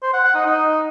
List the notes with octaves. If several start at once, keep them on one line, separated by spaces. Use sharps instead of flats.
C5
F#5
F#5
D#4
D#4